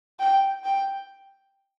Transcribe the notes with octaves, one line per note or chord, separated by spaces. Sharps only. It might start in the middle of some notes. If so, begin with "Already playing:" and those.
G5
G5